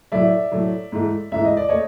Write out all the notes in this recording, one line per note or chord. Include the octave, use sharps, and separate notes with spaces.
A2 F#3 A3 D5 E5
A2 F#3 A3
G#2 E3 A3
G#2 E3 A3 E5
D#5
D5
A3 C#5 D#5